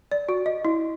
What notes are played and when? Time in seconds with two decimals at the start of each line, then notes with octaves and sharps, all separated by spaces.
0.12 D5
0.29 F#4
0.46 D#5
0.65 E4